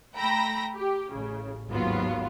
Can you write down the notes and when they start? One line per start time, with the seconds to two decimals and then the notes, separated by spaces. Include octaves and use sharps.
0.15 A3 G5 A#5 B5 E6 A#6
0.76 G4
1.12 A1 C#3
1.70 G#1 D#2 F#3 B3 F4